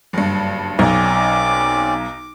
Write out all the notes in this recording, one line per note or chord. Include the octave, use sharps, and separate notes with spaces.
F#1 G2
B1 C4 C#4 D#4 D5 D6